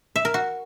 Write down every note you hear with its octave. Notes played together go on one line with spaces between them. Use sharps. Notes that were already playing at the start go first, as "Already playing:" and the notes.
E5
A#4
F#4